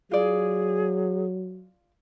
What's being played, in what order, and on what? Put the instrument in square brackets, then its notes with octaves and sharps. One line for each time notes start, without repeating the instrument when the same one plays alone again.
[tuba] F#3 [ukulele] F4 D5 [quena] G#4